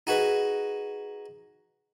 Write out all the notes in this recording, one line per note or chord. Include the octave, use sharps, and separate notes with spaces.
D#4 F#4 G#4 B4